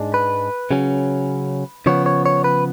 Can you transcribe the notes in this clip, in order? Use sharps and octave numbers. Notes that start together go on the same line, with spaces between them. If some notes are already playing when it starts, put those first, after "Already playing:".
Already playing: G#2 G#3 D4
B4
C#3 F#3 C#4
C#3 F3 B3 C#5
C#5
C#5
B4